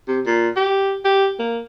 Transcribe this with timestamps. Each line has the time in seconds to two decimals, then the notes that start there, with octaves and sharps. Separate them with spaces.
0.08 C3
0.26 A#2
0.56 G4
1.05 G4
1.39 A#3